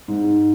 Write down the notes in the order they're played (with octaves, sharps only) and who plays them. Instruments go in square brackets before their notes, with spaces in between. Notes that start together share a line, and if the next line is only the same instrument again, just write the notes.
[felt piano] G#2